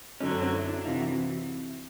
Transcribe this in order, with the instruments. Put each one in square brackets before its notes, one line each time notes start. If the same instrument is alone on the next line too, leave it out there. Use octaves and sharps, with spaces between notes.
[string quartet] F#2 D3 F#3 [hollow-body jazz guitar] C#4 D#4
[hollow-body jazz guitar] C4 D4
C4 D4
D4 E4
D4 E4
[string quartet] C3 E3 [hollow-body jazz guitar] D#4 F4
[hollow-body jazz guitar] E4 F#4